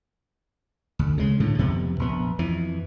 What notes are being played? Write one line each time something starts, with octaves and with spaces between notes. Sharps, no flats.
D2
C#3 G#3
A2 D3
F2 C3 B3
A#1 B3
F2 E3